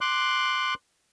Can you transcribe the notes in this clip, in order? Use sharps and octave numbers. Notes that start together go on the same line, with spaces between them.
C6 D6 F#6